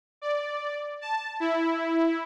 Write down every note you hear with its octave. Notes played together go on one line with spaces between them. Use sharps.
D5
A5
E4